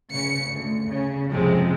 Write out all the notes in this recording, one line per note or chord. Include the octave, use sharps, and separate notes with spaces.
C#3 C#7
D2
C#3
F2 C3 F3 G#3 C4